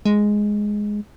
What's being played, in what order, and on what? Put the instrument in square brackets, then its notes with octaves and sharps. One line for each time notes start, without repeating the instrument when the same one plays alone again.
[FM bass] G#3